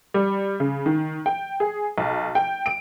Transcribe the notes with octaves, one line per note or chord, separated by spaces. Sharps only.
G3
C#3
D#3
G5
G#4
B1
G5
D7